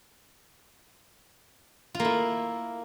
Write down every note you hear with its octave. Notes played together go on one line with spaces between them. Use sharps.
F4
A#3
E4